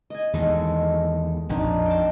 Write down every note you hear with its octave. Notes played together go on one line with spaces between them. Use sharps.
D#5 G#5
E2 D#3 G#3 A4
A#1 F2 A#2 D4 D#4
G5 A5